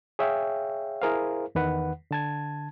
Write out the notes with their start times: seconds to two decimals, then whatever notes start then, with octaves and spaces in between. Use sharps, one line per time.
0.19 G#4 C#5 E5 F5 G5
1.02 E4 G#4 A#4 C5 F5
1.55 E2 D#3 B4 F#5
2.11 D3 A5 G#6